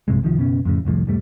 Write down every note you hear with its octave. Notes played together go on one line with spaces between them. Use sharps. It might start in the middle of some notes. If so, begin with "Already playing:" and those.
A#1 G2 C3 G#3
C2 D#3 F3
F#1 B2 B3 C#4
F2 A2 C#3
F1 C2 A2 F3
E1 G#2 G3 A3